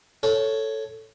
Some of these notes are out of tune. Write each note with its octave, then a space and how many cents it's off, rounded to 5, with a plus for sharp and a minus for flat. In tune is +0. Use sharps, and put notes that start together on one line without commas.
A4 +0 C#5 +0